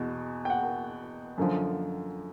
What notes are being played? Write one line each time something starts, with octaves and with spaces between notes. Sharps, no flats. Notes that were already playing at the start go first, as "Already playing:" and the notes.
Already playing: E2 B2
G5
F#5
F#2 D3 F3